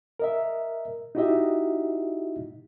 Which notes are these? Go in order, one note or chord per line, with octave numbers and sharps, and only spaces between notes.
A#4 D#5 E5
D#4 E4 F#4 G4 D#5 E5